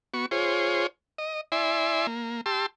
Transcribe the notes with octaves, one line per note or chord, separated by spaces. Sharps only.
B3 F#4 C#6
F4 G#4 C5 C#5
D#5
E4 D5 E5 G#5 C6
A#3
G4 A5 C6 E6